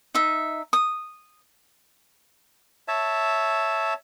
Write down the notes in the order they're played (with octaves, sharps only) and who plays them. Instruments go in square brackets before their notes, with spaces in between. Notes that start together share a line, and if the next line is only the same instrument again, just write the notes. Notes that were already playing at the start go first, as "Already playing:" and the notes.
[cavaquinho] D#4 E5
D#6
[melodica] C#5 E5 A5